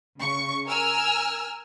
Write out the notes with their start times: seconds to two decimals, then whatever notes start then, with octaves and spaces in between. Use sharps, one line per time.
0.20 C#3 C#6
0.67 A#4 G#5 E6 F6